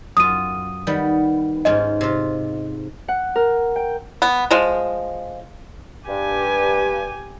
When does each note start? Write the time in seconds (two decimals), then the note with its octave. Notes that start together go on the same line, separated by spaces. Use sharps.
0.17 F#2 F4 D#6 D#7
0.87 D#3 G3 B3
1.65 G#2 C#4 F4 D#5
2.01 C3 F4
3.08 F#5
3.36 A#4
3.76 G5
4.22 B3
4.51 F3 G#3
6.08 G2 G4 G#5